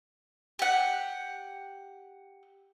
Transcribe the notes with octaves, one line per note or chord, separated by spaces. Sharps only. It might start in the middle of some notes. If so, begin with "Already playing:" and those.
G4 F#5